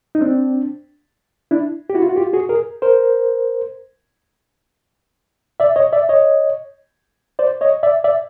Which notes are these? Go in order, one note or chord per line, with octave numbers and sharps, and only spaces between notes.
D#4
C4 D4
D4 E4
G4
E4 F#4
F4
F#4
F4 G4
F#4 G#4
G#4 A#4
A#4 C5
D5 E5
C#5 D#5
D5 E5
C#5 D#5
C5 D5
C#5 D#5
D5 E5
D5 E5